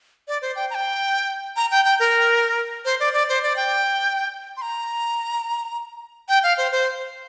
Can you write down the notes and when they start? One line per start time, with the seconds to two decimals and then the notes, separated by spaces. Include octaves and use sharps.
0.28 D5
0.42 C5
0.56 G5
0.70 A#5
0.75 G5
1.56 A#5
1.71 G5
1.85 G5
2.00 A#4
2.85 C5
3.00 D5
3.13 D5
3.29 C5
3.43 D5
3.56 G5
4.57 C6
4.62 A#5
6.29 G5
6.43 F5
6.58 C5
6.72 C5